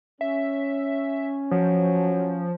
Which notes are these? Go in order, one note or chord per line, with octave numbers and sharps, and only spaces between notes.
C#4 E5
F3 F#3